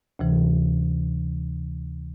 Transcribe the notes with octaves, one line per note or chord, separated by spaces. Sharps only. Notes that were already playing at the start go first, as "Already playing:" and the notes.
D2 C3 E3